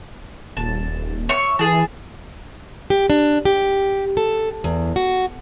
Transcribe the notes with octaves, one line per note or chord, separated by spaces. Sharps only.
D#1 A5
C#5 E5 C#6
E3 G#4 A5
G4
D4
G4
A4
E2
F#4